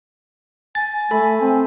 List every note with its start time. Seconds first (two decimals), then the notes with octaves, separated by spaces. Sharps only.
0.75 G#5 A6
1.11 A3 A4 B5
1.41 C4